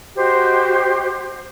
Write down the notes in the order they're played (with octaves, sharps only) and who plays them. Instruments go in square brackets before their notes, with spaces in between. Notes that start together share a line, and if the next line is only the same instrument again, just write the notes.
[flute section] F#4 G4 C5 D#5